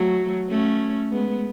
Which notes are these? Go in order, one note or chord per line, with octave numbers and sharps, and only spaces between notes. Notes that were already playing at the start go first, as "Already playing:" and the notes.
Already playing: F#3 A3
A3 C#4
G#3 B3